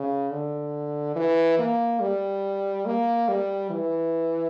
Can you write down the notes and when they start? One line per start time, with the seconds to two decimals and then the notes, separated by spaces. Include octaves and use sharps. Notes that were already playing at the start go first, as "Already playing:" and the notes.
Already playing: C#3
0.31 D3
1.16 E3
1.59 A#3
2.00 G3
2.86 A#3
3.28 G3
3.70 E3